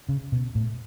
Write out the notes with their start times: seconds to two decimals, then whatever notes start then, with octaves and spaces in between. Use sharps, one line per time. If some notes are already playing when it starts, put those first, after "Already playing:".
0.09 C#3
0.32 B2
0.55 A2